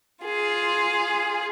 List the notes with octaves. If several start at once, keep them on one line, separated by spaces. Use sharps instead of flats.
F4 G#4